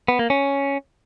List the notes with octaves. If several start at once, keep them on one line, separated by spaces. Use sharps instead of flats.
B3
A#3
C#4